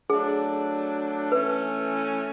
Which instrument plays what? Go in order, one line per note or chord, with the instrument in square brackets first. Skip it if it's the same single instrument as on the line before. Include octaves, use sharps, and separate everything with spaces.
[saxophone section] F#3 A3 D4 [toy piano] G#4
[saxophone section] E3 A3 C#4 [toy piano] B4